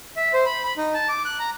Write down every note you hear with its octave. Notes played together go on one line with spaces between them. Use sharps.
E5
C5
B5
B5
D#4
A5
D6
F#6
A#5